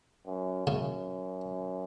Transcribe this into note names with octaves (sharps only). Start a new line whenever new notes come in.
F#2
F#2 C#3